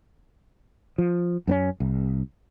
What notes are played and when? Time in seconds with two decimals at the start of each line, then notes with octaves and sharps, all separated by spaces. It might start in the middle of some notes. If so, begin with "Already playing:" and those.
0.98 F3
1.47 F#2 B3 C#4
1.80 C2